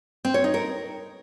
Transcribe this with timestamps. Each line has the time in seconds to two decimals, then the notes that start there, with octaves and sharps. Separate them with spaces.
0.25 C4
0.34 C#5
0.44 D#4
0.54 A#4